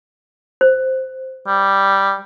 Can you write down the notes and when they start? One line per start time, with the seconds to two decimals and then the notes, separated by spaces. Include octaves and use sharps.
0.61 C5
1.47 G3